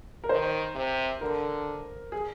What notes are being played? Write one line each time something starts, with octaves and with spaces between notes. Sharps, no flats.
A#4
D#3 C5
C3
D3 A#4
G#4